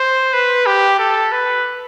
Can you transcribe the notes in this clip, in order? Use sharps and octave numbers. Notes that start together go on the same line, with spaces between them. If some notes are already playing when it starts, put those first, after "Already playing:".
Already playing: C5
B4
G4
A4
B4